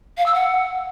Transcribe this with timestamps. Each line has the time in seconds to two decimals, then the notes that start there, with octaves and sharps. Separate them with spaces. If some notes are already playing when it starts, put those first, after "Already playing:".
0.18 F5
0.26 E6
0.34 F#5